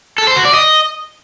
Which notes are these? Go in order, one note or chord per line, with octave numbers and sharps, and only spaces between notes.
A4
C5
F#4
D5
D#5